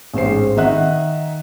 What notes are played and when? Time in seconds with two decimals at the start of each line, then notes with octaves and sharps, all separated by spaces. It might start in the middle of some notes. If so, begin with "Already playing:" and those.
0.14 A1 G#2 C5 C7
0.57 D#3 D#4 D#5 E5 F#5 F#6